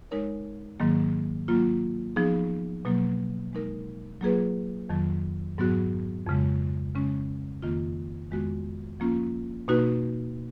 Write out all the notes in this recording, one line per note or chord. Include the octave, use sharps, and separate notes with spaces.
G#3 D#4 A#4 C#5
G#2 D#3 F#3 A#3
F#3 A#3 F4
F3 B3 D#4 G#4
B2 F#3 A#3
G#3 D#4 A#4
F#3 A#3 F4 G#4 B4
F2 D#3 F#3
G#2 F#3 B3 F#4
F2 C#3 G#3
C#3 G#3 C#4
F2 D#3 A#3 F4
F2 D#3 G#3 B3 F#4
F3 A#3 C#4 F4
B2 A#3 D#4 F#4 B4